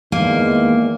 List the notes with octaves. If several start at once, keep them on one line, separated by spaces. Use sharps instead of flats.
E2 D#3 G#3 A#3